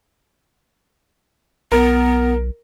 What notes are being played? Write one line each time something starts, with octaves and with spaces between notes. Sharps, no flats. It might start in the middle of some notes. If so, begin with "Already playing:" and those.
B1 B3 A#4